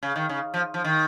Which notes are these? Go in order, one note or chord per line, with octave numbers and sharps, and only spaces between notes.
C#3
D#3
C#3
F3
F3
D#3